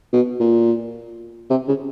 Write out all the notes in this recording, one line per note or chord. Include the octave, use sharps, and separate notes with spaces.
B2
A#2
C3
C#3